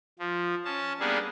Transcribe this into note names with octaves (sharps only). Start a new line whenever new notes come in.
F3
C#4 A5
G3 A#3 B3 D4 G#4